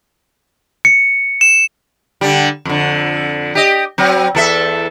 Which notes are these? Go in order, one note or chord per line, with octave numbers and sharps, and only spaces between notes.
C#7
E7
D3 G3
F2 D3
G4 D#5
F#3 C4
E2 A4 E5